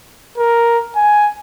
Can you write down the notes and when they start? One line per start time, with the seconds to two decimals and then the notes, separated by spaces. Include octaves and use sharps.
0.38 A#4
0.96 G#5